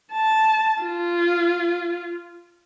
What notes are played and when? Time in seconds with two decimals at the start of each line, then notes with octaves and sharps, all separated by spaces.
0.12 A5
0.83 F4